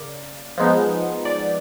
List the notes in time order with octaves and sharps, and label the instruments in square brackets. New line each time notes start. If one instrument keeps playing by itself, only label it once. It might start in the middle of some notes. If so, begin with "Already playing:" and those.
Already playing: [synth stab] C#3 A#3 D5
F3 G#3 B3 D#4
D5